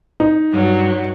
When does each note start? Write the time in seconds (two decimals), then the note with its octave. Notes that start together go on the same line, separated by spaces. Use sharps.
0.20 D#4
0.51 G2 F#3